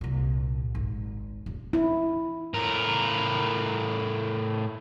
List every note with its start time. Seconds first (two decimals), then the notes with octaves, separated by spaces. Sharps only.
0.01 C2 A#2
0.75 G#1
1.46 D#1
1.73 E4
2.54 A2 A#4